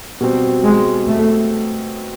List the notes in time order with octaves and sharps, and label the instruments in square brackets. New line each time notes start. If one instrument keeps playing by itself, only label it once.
[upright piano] B2 G3 C4
[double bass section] G#3
A3